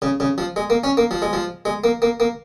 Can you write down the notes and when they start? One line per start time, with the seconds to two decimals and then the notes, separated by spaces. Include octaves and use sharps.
0.02 C#3
0.20 C#3
0.38 F3
0.56 G#3
0.70 A#3
0.84 C#4
0.97 A#3
1.11 F3
1.22 G#3
1.33 F3
1.65 G#3
1.84 A#3
2.02 A#3
2.20 A#3